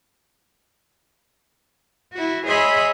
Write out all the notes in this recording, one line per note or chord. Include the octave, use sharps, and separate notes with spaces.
E4 F#4
G#4 C#5 D#5 E5 B5 C6